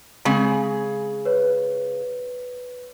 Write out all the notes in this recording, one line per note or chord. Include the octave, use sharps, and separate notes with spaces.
C#3 G#3 C4 G#4
B4 C#5